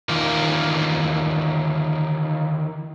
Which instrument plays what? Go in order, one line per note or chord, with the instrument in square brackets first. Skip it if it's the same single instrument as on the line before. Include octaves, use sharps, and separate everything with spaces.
[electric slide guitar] D#3 E3 A#3 F4 A#4